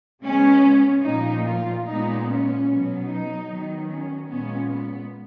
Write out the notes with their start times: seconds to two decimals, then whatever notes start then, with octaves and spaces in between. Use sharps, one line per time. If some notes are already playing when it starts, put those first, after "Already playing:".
0.22 C#3 G#3 B3 C#4
1.03 A#2 F3 A#3 D#4
1.44 F4
1.84 A#2 G#3 B3 D#4
2.26 C#4
2.66 B2 F#3 B3
3.06 D#4
3.47 D#3 F#3 B3
3.88 C#4
4.28 A#2 G#3 B3 C#4
4.69 B3